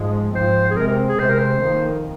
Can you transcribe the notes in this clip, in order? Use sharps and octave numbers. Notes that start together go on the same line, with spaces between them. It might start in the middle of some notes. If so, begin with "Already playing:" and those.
Already playing: G#2 F3 G#3
G#2 F3 C4 C5
G#4
C3 G#3 C4 A#4
A#4
G#4
C3 G#3 C4 C5
A#4
C5
F2 D#3 A#3